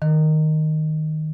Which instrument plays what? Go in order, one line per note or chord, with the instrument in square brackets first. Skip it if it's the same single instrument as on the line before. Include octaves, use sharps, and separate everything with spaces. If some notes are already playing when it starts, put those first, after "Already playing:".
[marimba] D#3